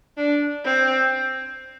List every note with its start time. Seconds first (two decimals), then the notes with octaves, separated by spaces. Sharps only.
0.17 D4
0.65 C4